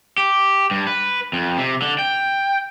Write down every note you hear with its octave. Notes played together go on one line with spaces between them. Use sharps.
G4
G2
B4
F2
C3
D3
G5